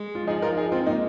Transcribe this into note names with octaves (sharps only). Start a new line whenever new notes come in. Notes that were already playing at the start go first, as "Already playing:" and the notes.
Already playing: G#3
F4
F3 D#4 G#4
F4 A#4
D#4 G#4
G#3 C4 F4
A#3 D#4